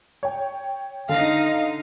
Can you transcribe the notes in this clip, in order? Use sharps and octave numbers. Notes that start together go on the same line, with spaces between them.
C#5 G5
D3 D#4 D#5 F5